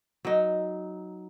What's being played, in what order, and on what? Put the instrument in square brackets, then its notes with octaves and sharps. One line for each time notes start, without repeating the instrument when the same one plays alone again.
[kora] F#3 D#4